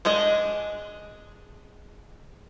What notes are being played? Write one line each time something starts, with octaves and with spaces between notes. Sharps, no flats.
G#3 D4 G#4 D#5